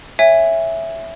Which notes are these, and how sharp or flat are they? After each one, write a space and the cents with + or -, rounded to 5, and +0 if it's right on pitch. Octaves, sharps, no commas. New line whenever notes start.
C#5 +0 E5 +0 G#5 -25